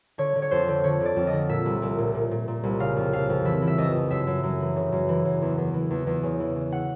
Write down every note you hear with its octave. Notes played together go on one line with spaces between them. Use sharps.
D3 C#5
D3
C#5
F2 C5
D3
D3 C#5
D3
D5
F2
D#5
D3
A#2 E5
C2
C2
A#2
A#2
A#2
A#2
C2
C#3 F5
F2
F2 F5
F2
E3 E5
E3
E5
F2 D#5
F2
F#2 E5
F#2
F#2
E3
C#3
F#2
E3
F#2
E2
E2
E3
E2
E2
C#3
E3
C#3
F#5